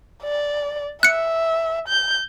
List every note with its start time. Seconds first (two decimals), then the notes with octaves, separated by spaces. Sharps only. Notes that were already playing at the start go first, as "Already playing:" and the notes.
0.23 D5
1.03 E5 F#6 C#7
1.88 G6